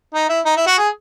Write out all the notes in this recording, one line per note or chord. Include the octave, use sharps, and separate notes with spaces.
D#4
E4
D#4
E4
F#4
G#4